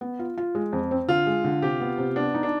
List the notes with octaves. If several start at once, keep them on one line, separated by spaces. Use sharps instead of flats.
B3
F4
F4
G#3
F2
C4
D3 F4
G#3
D3
C3 G4
B3
C3
B3 D4
D#4
D4